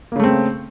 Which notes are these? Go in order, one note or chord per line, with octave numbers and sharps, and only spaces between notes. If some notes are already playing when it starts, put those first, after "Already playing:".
C#3 A3 A#3 C4